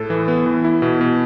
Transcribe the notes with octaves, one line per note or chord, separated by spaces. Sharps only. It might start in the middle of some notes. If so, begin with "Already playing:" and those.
Already playing: A2 A4
E3
B3
E3
E4
B2
B2